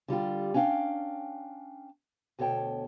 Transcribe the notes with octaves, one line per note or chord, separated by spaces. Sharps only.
D3 G3 F4 G4
C#4 D4 F5 G5
D2 B2 A4 C#5 G5 A5